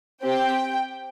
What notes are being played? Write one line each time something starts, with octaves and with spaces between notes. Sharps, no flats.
C4 G4 G5